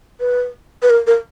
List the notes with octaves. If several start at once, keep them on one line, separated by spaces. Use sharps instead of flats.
B4
B4
A#4
A#4